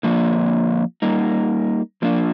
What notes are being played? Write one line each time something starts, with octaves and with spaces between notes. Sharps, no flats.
D3 F3 A#3
G3 A#3 D#4
F3 A#3 D4